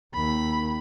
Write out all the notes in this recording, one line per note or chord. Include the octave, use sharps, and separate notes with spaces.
D#2 B5